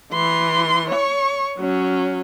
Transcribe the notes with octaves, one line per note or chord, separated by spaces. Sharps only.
E3 C6
C#5 C#6
F#3 C#4